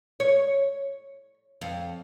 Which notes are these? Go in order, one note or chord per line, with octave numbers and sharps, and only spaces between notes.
C#5
F2